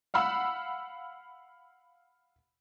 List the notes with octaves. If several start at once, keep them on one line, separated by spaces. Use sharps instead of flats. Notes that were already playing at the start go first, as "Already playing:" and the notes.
F5 F#5 B5 E6